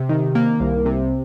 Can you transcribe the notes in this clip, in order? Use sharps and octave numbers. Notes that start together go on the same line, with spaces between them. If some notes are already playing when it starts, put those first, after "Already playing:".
Already playing: C3
D#3
A#3
C2
C3